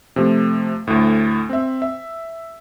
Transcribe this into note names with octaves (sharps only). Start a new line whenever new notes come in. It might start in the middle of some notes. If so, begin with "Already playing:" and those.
C3 F3 A3
D2 A2
C4 E5
E5